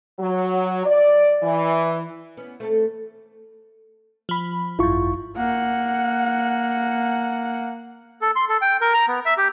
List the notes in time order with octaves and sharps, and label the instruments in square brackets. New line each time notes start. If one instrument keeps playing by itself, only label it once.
[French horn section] F#3
D5
E3
[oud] B3 C#4
A3 C4 A4
[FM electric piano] F3 B5
[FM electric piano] G#1 F#2 [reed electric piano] E4 F4 C#6
[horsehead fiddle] A#3 F#5
[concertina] A4
C6
A4
G5
A#4
A#5
B3
E5
G4